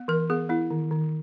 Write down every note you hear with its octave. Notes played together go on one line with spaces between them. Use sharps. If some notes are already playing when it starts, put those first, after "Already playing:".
Already playing: B3
E3 A#4
B3 G#4
B3 E4
D#3
D#3